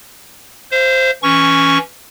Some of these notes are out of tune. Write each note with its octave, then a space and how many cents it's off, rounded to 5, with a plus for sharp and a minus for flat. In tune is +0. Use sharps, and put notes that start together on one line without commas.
C5 +0 F5 -35
E3 +0 C#4 +0 C#6 +0